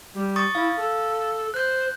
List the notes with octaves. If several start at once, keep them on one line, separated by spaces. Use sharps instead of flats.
G3
C#6 D#6 A6
E4 F5
A4
C5 F#6 G6